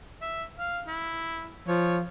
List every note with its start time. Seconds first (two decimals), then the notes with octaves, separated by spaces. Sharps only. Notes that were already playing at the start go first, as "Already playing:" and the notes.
0.22 E5
0.59 F5
0.88 E4
1.68 F3 C#5